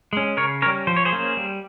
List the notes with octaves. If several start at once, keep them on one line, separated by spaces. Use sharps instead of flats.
G#3 C#4
C#3 A#4 C#5
G3 C#4 A#4 C#5
F3 C5
C#5
G#4 C5
A#3 C#4
G3